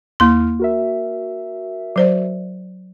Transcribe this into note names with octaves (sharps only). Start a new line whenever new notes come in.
D#2 A#3 E4 C6 F6
F#4 A#4 E5
F#3 C5 D5